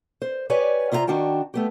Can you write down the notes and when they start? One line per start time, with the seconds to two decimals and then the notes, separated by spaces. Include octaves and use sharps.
0.22 C5
0.50 G4 B4 C#5 D5 G#5
0.92 C3 E4 F4 E5 A#5
1.07 D#3 D4 F#4 G5 A5
1.54 A3 B3 G4